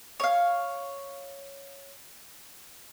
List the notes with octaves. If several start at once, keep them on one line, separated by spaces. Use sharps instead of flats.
C#5 F5